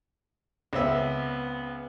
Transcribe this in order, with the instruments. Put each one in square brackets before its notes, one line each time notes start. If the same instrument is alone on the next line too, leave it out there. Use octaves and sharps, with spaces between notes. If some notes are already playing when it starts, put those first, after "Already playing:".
[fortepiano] C#2 C4 E5 [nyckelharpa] B3